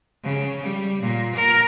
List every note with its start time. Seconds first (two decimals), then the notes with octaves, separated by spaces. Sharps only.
0.23 C#3
0.63 G3
1.02 A#2
1.35 A#4